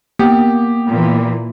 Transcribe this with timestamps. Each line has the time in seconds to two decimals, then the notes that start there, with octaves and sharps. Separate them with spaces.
0.19 A#3 B3 G4
0.88 A#2 E3